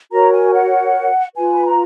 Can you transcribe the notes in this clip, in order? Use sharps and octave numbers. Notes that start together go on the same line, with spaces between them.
F#4 A#4 C#5 A#5
G#5
F#5
F4 B4 G#5
B5
A#5